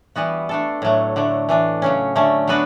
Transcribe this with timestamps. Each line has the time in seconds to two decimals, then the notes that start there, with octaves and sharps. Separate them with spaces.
0.16 E3 G3 B3 F#4
0.49 A3 D4 A4
0.82 A2 F#3 A3
1.16 D3 F#3 A3
1.49 E3 A3 D4
1.82 C#3 F#3 C#4
2.15 D3 A3 C#4
2.48 F#3 B3 D4 F#4 B4